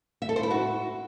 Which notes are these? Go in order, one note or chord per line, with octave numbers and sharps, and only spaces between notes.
E5
A4
C5
E4
F#4